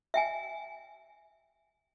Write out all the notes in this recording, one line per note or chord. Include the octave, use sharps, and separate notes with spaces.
E5 G5 G#5